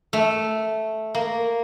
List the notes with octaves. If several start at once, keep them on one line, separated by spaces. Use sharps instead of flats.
A3
A#3